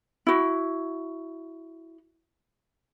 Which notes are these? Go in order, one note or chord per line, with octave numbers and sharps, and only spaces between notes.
E4 F#4